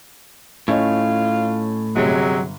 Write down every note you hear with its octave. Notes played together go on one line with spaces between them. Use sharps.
A2 C#4 F4 C#5 D#5
G1 C3 F#3 G#3